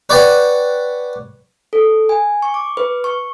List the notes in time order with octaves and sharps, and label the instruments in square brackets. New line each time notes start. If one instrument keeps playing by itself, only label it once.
[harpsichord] B4 C#5 D5 F#5 G5
[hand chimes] A4
G#5
C#6
D6
B4
C#6